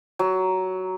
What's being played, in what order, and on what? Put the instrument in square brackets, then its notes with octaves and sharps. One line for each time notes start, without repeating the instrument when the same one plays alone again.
[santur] F#3